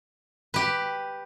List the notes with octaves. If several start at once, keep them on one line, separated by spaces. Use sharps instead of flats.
G4 B4